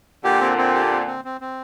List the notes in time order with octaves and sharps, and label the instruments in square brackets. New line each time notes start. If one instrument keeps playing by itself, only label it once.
[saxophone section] A#2 D3 [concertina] G4
[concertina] C4
C4
G4
C4
C4
C4
C4